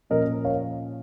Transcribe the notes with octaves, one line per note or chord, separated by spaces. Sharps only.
A#2 F3 C#4 A#4 D#5
C#5 F5